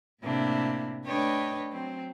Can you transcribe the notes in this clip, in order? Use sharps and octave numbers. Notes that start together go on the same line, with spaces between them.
A2 C3 A#3 D4 E4
A3 D4 B4 C#5 D#5 G5
F#3 C4